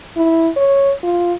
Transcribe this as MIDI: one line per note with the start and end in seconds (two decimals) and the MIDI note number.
0.17 0.49 64
0.56 0.92 73
1.03 1.33 65